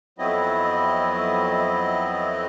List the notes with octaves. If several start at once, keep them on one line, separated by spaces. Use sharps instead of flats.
F2 F#3 B3 C4 E4 D#5